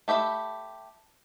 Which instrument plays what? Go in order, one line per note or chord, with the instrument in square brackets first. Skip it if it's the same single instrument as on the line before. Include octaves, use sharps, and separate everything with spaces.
[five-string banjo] A3 G4 E5 B5